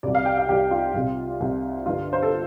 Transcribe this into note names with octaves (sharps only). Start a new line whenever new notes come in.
C2 C3 D5
F5
G5
F5
C2 C3 G4
F4
C2 C3
C2 C3
G1 G2 D3 F4
C5
A4